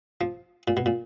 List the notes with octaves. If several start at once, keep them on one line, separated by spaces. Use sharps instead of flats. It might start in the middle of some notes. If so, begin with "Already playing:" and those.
F3
A#2
B2
A#2